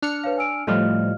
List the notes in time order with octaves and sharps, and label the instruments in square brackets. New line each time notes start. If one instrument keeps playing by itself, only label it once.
[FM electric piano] D4 F6 C#7 [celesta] F#6
[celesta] B4 C#5 F5
G#5 E6 D7
[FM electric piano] A2 F3 G3 [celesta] D#5 F5 F6